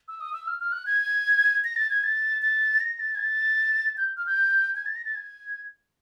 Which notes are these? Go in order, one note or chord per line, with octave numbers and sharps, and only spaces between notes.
E6
D#6
E6
F6
F6
F#6
G#6
A#6
A6
G#6
A6
A6
A#6
A6
G#6
A6
G6
F6
G6
G#6
A6
A#6
A6
G#6